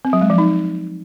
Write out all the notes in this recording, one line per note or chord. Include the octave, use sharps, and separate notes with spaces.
C4
F#3
G#3
F3
D#4